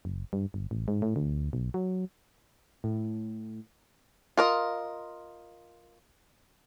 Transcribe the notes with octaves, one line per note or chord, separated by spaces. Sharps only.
F#1
G2
G1
A1
G#2
A2
D2
B1
F#3
A2
F4 A#4 D#5